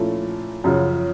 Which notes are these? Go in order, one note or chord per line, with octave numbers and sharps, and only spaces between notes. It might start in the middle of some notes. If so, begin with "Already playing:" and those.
Already playing: A#2 F3 A3 C#4 E4
F#2 C#3 F3